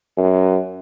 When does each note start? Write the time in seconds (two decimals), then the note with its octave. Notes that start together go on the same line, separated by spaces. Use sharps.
0.17 F#2